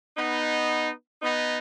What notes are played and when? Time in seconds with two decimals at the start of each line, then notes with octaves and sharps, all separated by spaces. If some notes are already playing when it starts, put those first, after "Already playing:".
0.17 B3 D#4
1.22 B3 D#4